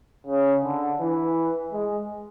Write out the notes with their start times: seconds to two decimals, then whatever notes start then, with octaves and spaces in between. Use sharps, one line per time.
0.27 C#3
0.64 D3
1.00 E3
1.72 G#3